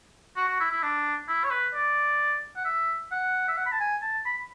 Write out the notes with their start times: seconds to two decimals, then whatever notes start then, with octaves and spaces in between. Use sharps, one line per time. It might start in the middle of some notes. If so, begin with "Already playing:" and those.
0.37 F#4
0.48 F#4
0.60 E4
0.71 E4
0.83 D4
1.28 E4
1.44 C#5
1.51 B4
1.74 D5
2.56 F#5
2.65 E5
3.11 F#5
3.48 E5
3.57 F#5
3.66 B5
3.72 A5
3.80 G#5
4.02 A5
4.25 B5